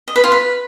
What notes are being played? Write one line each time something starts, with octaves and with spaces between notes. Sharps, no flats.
D#5
B4
F4
B4